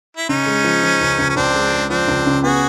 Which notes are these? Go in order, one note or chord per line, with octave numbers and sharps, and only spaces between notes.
E4
C#3 C#4 D#4
G#3
F3
F3
C#2
C#2
C#4
C#2 C4 D4
G#3
G#3
F3 C4 D4
C#2
C#3
B3 F#4 G#4